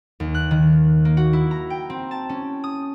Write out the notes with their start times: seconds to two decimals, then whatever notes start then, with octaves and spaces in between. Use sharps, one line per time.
0.20 D#2
0.34 F#6
0.51 D#3
1.05 A#3
1.17 F#4
1.33 E4
1.51 A#5
1.70 G5
1.90 C4
2.11 A5
2.29 C#4
2.64 D#6